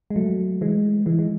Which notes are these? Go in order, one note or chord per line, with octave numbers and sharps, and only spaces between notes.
G#3
F#3 A3
E3 G#3
E3 G#3
G#3